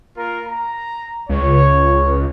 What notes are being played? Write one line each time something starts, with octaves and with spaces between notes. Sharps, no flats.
A#3 F4 A#4
A#5
C#2 C#5